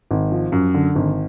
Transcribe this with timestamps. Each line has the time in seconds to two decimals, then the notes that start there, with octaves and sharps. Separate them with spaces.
0.11 G#1
0.32 F3
0.52 F#2
0.74 D3
0.96 G#1